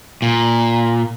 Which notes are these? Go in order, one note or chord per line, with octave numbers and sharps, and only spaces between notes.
A#2